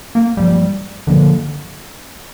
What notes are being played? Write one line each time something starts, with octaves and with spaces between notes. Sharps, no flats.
A#3
G2 F3 G3 A#3
G2 D3 F3 A#3